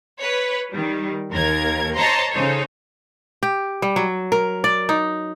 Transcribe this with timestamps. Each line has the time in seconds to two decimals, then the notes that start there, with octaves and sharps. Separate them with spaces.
0.20 B4 C#5
0.72 D#3 G3
1.31 D#2 A#4 G#6
1.96 C5 C#5 D#5 A5 A#5 C6
2.31 C#3 D#4 A4 C5 C#5
3.43 G4
3.82 G3
3.96 F#3
4.32 A#4
4.64 D5
4.89 D#4